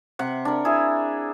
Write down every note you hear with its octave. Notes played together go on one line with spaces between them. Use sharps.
C3 F#5
D4 A#4
E4 G#4